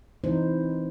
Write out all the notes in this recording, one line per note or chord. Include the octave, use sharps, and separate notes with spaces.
E3 C4 D#4 E4 C5